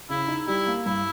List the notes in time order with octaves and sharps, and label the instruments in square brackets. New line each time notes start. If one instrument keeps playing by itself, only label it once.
[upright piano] C#3 [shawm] E4
[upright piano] D#4
[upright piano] G3 [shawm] E4
[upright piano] A#3
[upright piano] G2 [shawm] E4